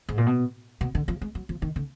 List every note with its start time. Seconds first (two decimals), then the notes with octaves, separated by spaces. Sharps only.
0.09 G#2
0.18 A#2
0.26 B2
0.81 B2
0.95 D3
1.08 F3
1.21 G#3
1.35 F#3
1.49 F3
1.62 D#3
1.76 D3